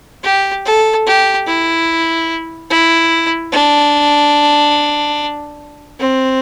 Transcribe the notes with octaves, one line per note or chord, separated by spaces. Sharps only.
G4
A4
G4
E4
E4
D4
C4